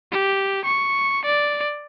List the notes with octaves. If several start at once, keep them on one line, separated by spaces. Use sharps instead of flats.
G4
C#6
D5